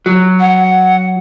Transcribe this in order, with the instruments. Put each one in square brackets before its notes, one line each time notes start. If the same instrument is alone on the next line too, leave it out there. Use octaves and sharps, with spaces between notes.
[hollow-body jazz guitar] F#3
[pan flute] F#5